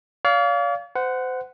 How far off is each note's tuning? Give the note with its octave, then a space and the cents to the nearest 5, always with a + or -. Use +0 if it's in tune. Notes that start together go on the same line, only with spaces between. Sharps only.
D5 -45 F5 +0
C5 -30 F#5 +0